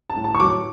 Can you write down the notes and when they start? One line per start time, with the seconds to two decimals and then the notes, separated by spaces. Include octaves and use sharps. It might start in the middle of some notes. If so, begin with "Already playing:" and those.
0.10 A5
0.16 A2
0.24 A5
0.35 C#6
0.39 F#3 D6